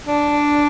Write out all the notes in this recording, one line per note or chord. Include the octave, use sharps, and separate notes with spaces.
D4